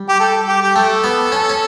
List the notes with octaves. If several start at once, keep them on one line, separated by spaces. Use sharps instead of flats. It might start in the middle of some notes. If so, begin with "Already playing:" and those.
Already playing: G3
G4
A4
G4
G4
A3 A4
B3
C#4
C#4